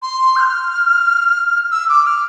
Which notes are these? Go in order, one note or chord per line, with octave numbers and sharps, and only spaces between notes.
C6
G6
F6
E6
D6
F6